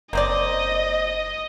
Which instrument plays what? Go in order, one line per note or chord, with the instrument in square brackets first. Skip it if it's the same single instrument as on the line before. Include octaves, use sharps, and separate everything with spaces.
[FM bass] F#1 [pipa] A#3 C4 D5 [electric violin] D#5